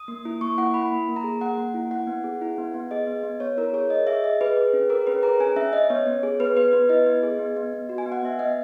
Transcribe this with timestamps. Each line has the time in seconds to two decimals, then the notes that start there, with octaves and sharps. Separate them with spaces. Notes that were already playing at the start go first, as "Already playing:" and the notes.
Already playing: D#6
0.08 A#3
0.25 E4
0.41 A#3 C#6
0.58 E4 F#5
0.74 E4 B5
0.92 A#3
1.08 A#3
1.16 A#5
1.24 G#4
1.41 A#3 F#5
1.58 A#3
1.74 E4
1.91 E4 F#5
2.07 B3
2.24 G#4
2.41 E4
2.58 B3
2.74 B3
2.91 G#4 D#5
3.07 B3
3.23 B3
3.40 B3 C#5
3.57 E4 A#4
3.73 G#4 C#5
3.90 G#4 D#5
4.07 G#4 E5
4.24 G#4 D#5
4.41 G#4 B4
4.56 G#4
4.73 C#4
4.90 G#4 A#4
5.07 C#4 B4
5.23 G#4 A#5
5.40 C#4 G#5
5.56 C#4 E5
5.73 C#4 D#5
5.90 B3 C#5
6.07 B3
6.23 G#4
6.40 B3 B4
6.57 B3 B4
6.73 B3 B4
6.89 E4 D#5
7.06 B3
7.23 G#4
7.39 B3
7.57 B3
7.73 B3
7.89 F#4
7.98 G#5
8.06 B3
8.12 F#5
8.23 B3 E5
8.39 B3 D#5